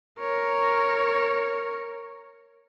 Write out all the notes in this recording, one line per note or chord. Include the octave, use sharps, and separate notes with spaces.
A#4 C#5